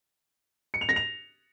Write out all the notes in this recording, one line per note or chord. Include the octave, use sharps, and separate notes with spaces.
C#7
F7
A#6
F7